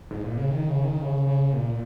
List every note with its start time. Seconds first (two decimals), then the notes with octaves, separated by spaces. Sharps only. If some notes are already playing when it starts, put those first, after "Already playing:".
0.11 G#2
0.24 A#2
0.37 C#3
0.50 D#3
0.67 C#3
0.84 D#3
1.02 C#3
1.27 C#3
1.53 A#2